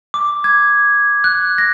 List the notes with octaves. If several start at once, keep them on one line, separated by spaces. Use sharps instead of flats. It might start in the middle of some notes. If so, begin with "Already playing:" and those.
D6
G#6
F#6
A#6